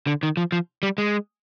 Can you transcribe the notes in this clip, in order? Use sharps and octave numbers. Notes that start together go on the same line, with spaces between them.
D3
D#3
F3
F3
G3
G#3